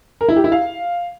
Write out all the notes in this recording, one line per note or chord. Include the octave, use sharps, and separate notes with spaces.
A#4
E4
G4
E4
F5